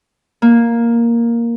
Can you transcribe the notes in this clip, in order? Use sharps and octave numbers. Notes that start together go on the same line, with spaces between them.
A#3